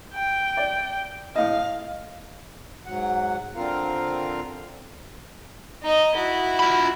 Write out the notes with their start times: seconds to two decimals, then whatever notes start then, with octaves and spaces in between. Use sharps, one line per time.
0.14 G5
0.57 D5
1.36 A2 D#5 F5
2.86 G#2 F#3 F#5
3.56 D3 C4 F4 A#4 F5
5.83 D#4 D#5
6.15 E4 F#4
6.60 F4 B5